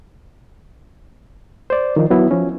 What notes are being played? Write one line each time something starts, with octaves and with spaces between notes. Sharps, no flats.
C5 D5
D#3 F3 D#4
F#3 B3 E4
F3 C#4